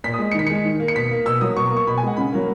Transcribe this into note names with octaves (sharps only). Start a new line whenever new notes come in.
A#2 B6
D#6
G#3
C#7
D#3 B6
G#3 C#7
D#3
A#3
C#7
B2 B6
A#3
B2 E6
F#3 A#3 D#6
B2 C#6
A#5
A#3
C#6
B2 B5
G#5
G#3 F#5
C#3 B5
F#3 A#3